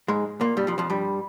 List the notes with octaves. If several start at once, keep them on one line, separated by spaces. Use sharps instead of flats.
G#2 G#3
A#2 A#3
G2 G3
F2 F3
F2 F3
G2 G3